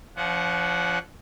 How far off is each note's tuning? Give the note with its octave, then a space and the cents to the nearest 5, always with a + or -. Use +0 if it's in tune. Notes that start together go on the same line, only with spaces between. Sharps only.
F3 -15 C#4 +45 F#5 +0